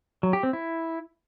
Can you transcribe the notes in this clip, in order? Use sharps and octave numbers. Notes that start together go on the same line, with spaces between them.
F#3
G4
C4
E4